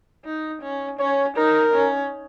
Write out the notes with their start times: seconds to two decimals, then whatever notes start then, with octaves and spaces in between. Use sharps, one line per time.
0.25 D#4
0.62 C#4
0.99 C#4 C#5
1.37 D#4 A#4
1.74 C#4